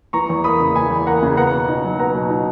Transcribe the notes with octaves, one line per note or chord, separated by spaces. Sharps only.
E3 A#5 C#6
E2
A#3 B5 D#6
C#3
E3 G#5 B5
E2
A#3 F#5 A#5
C#3
B3 F#5 A#5
B2
D#4
F#3
B3 F#5 A#5
B2
D#4